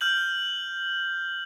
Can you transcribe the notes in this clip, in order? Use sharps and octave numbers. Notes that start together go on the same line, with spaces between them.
F6 G6 F#7